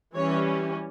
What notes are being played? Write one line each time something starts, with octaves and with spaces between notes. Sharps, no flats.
E3 G3 C#4 C#5